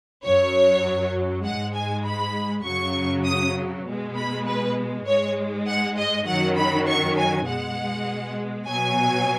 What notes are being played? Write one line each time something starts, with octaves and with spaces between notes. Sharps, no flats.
F#2 F#3 C#5
G#2 G#3 F#5
G#5
B5
F#2 C#3 F#3 C#6
D#6
B2 G#3
B5
B4
G#2 G#3 C#5
F#5
D#5
F#2 D#3 F#3 F#5
B5
C#6
G#5
B2 G#3 F#5
B2 F#3 G#5